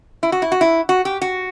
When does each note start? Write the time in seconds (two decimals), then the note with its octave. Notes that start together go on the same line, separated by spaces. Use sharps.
0.23 E4
0.32 F#4
0.42 E4
0.52 F#4
0.61 E4
0.89 F#4
1.05 G4
1.22 F#4